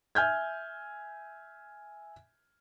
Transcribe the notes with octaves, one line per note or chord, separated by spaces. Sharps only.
E5 G#5 F6 G6 G#6